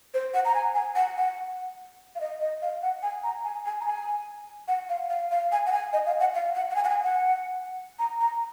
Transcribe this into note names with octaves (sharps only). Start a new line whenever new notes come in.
C5
F#5
A#5
G#5
G#5
F#5
F#5
F5
D#5
D#5
F5
F#5
G#5
A#5
G#5
G#5
A#5
G#5
F#5
F5
F5
F5
G#5
F#5
G#5
D#5
F5
F#5
F5
F#5
F#5
G#5
F#5
G#5
F#5
A#5
A#5